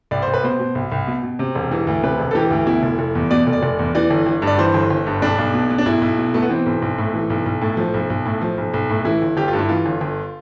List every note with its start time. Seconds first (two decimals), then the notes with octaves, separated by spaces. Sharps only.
0.11 C2 D5
0.22 C2 C5
0.34 B4
0.44 B2 C5
0.60 B2
0.75 C2
0.92 C2
1.07 B2
1.23 B2
1.39 C3
1.55 E1
1.71 E3
1.87 D2
2.03 C3 B4
2.19 E1
2.31 A4
2.35 E3 G4
2.51 D2
2.67 B2 E4
2.83 F1
2.99 F1
3.15 E2
3.31 B2 D5
3.47 F1
3.53 D5
3.63 F1
3.79 E2
3.95 E3 D5
4.11 G1
4.26 G1
4.42 G2
4.47 D5
4.58 E3 C5
4.74 G1
4.90 G1
5.06 G2
5.22 B1 D4
5.38 B1
5.54 B2
5.70 B2
5.78 D4
5.86 B1 E4
6.02 B1
6.17 B2
6.34 B2 A3
6.42 B3
6.49 E3 C4
6.66 B1
6.82 B1
6.98 A2
7.14 E3
7.30 B1
7.46 B1
7.61 A2
7.77 F3
7.94 B1
8.10 B1
8.25 A2
8.42 F3
8.58 B1
8.74 B1
8.89 A2
9.05 E3 E4
9.22 G1
9.37 G1 G4
9.48 F4
9.53 G2
9.59 E4
9.69 E3 F4
9.86 G1
10.01 G1